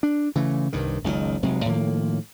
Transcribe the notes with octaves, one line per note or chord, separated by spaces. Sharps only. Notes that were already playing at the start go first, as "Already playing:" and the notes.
D4
C#3 E3 A3
C2 G2 D#3
F#1 C#2 A#2 D#3
F1 C3 F#3 G#3
A2 D#3 F3 A#3